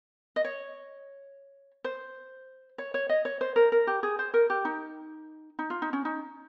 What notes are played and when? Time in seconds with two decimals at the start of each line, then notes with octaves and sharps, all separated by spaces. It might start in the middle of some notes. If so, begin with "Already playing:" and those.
0.36 D#5
0.44 C#5
1.84 C5
2.78 C#5
2.94 C#5
3.09 D#5
3.25 C#5
3.41 C5
3.56 A#4
3.72 A#4
3.87 G4
4.03 G#4
4.19 C5
4.34 A#4
4.50 G4
4.65 D#4
5.59 D#4
5.70 F4
5.82 D#4
5.93 C#4
6.05 D#4